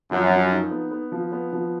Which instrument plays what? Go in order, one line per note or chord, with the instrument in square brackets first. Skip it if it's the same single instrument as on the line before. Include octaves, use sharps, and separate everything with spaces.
[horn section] F#2 [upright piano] F3
[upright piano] F3
D#4
B3
B3
F3
B3
F3